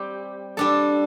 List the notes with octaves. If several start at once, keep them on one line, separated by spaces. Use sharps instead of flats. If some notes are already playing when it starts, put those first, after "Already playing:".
Already playing: G3 C4 G4
G3 D4 A4